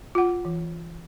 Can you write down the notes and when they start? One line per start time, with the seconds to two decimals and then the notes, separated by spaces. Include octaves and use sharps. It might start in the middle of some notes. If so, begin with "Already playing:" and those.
0.15 F4 F#5
0.45 E3